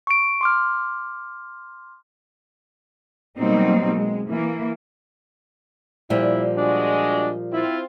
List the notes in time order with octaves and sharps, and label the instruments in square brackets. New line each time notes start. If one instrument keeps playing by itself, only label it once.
[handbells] C#6 D7
C6 D6 F6
[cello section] B2 F#3 G3 A#3 C4 D#4
G#3
E3 A#3
[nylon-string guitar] A#2 F3 G3 [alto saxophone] E4
[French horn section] G#3 F#4 [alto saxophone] D4
[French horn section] C4 F4 [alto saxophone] E4